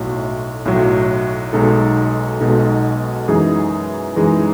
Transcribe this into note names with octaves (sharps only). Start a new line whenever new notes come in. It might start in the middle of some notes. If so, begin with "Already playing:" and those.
Already playing: B1 A2 F#3
B1 A2 F#3
B1 B2 G#3 D#4 A4
B1 B2 G#3 D#4 A4
F#2 E3 G#3 D#4 G#4
F#2 E3 G#3 D#4 G#4